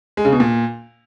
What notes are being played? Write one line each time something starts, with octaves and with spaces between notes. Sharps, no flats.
G#3
C#3
B2
A#2